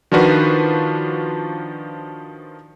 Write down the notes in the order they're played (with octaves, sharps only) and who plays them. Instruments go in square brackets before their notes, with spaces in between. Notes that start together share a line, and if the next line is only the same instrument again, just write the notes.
[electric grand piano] D#3 F3 D4 F4 F#4 B4